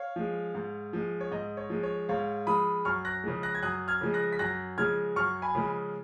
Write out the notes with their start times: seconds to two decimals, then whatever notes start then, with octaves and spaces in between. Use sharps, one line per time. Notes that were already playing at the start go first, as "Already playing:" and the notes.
Already playing: C#5 F5
0.16 F3 G#3
0.55 G#2
0.93 F3 G#3
1.21 C#5
1.31 G#2 D#5
1.57 C#5
1.70 F3 G#3
1.83 C#5
2.09 G#2 C#5 F5
2.47 F3 G#3 B5 D#6
2.85 F#2 C#6 F6
3.05 F#6 A#6
3.24 C#3 F3 G#3
3.43 F#6 A#6
3.55 G#6
3.63 F#2 D#6 F#6
3.88 F6 G#6
4.01 C#3 F3 G#3
4.14 F#6 A#6
4.32 B6
4.39 F#2 F#6 A#6
4.78 C#3 F3 G#3 F6 G#6
5.16 F#2 C#6 F6
5.42 G#5 B5
5.55 C#3 F3 G#3